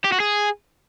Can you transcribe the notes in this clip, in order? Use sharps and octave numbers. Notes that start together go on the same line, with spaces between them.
G4
F#4
G#4